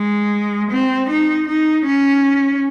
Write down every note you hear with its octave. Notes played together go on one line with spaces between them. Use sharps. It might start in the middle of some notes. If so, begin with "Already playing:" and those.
Already playing: G#3
C4
D#4
D#4
C#4